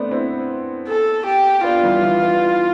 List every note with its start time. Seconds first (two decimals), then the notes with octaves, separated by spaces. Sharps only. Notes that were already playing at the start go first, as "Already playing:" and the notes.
Already playing: A3 B3 C4 D4
0.11 C4 E4
0.87 A4
1.26 G4
1.64 B3 D4 F4
1.83 E3 G3
2.02 E3
2.22 E3